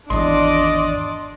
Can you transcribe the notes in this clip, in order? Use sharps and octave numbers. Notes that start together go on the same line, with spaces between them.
G#1 E2 D4 D5 D#5 C6